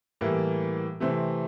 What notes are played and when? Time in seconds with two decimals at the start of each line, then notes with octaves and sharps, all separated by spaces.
0.21 A2 E3 G3 A#3
1.00 C3 E3 A3 C4